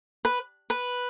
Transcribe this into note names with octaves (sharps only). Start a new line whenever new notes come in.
B4
B4